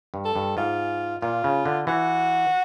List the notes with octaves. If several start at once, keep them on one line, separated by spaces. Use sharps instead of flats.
G2
A4
G2
G#2 F4
A#2 F4
C#3
D3
E3 F#4